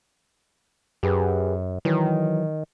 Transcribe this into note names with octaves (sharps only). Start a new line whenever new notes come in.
F#2 G4 G#4 B4
D#3 E3 F#3